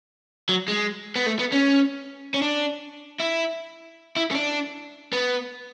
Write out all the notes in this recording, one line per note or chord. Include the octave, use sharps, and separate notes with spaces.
F#3
G#3
B3
A3
B3
C#4
C#4
D4
E4
E4
C#4
D4
B3